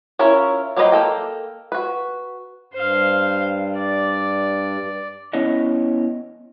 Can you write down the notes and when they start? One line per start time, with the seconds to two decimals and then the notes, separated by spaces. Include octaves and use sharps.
0.19 C#4 E4 F4 A#4 C#5
0.77 F#3 A#3 G4 B4 D#5
0.92 A#3 A4 G5
1.72 F#4 B4
2.73 G2 C5 F5
3.77 D5
5.33 B3 C#4 E4 C#5 D#5